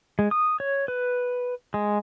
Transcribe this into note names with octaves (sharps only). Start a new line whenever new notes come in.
G#3
D#6
C#5
B4
G#3